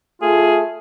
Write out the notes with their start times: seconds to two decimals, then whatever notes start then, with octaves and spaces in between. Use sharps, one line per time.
0.22 A3 F4 G#4